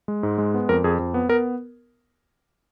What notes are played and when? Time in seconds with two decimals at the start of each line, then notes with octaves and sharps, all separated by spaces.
0.08 G#3
0.23 G#2
0.38 G#3
0.54 B3
0.69 F2 A#4
0.84 F2 G#4
0.99 F2
1.14 B3
1.29 B3 A#4